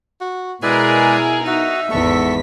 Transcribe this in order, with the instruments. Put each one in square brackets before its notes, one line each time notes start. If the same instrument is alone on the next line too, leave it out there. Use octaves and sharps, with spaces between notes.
[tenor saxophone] F#4
[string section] B2 G#4 A#4 [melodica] G#3 B4 D5 [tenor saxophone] E4
[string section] D#4 [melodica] F#4 [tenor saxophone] E5
[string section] G#1 E2 B6 [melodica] A4 C#6